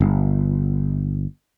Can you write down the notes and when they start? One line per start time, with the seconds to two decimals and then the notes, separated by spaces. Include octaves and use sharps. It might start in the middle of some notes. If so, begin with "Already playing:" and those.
0.01 G1